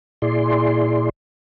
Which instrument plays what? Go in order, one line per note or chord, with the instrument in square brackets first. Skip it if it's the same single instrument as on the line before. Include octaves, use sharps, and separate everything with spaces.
[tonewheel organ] A#2 E4 G#4 D5 C6